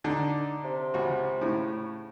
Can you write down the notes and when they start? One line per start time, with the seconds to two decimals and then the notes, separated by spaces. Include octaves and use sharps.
0.04 D3 D4 D#4
0.64 C3
0.94 C#2 F#4
1.41 A2 C#3